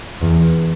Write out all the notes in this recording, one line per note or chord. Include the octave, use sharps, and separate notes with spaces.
E2